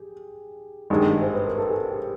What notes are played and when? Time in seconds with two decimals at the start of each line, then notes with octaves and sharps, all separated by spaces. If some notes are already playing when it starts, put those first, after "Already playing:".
Already playing: G4 G#4
0.90 G#1 G2 D#3 G#3
1.21 C5
1.34 B4
1.46 A#4
1.58 A4
1.70 G#4
1.90 G4